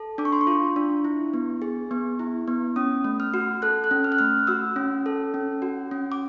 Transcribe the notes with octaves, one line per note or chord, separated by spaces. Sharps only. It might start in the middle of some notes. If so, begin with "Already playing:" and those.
Already playing: A4
D4 D6
C#6
C6
C#6
F4
D4
E4
B3
G#4
B3
E4
B3
C#4 D#6
A3
F6
F#4
A4 F#6
F#6
C#4
F6
F#6
A3 F6
F#4 E6
C#4
A4
C#4
F#4
C#4
D6